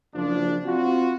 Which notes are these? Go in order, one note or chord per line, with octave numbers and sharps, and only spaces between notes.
F#1 F3 D4
C4 F4 F#4